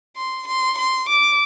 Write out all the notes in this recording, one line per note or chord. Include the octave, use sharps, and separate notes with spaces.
C6
C6
C6
D6